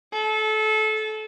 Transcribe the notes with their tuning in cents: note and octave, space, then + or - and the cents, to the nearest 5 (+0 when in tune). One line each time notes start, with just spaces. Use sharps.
A4 -25